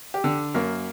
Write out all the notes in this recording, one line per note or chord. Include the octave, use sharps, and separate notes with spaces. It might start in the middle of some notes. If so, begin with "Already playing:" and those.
G4
D3
F#2 A#3